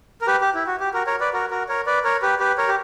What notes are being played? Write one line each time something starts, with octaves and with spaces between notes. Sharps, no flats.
A#4
G4 B4
G4
E4
F#4
G4
F#4 A#4
A#4 C#5
B4 D5
F#4 A#4
F#4 A#4
A#4 C#5
B4 D5
A#4 C#5
G4 B4
G4 B4
A#4 C#5
G4